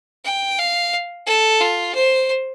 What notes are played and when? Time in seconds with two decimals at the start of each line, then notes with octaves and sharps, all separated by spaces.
0.25 G5
0.58 F5
1.26 A4
1.61 F4
1.95 C5